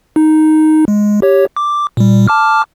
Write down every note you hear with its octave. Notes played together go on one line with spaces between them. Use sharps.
D#4
G#3
G4 C#5
D6
A#2 G3
A5 D6 F6